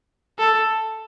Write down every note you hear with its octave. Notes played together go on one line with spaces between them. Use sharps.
A4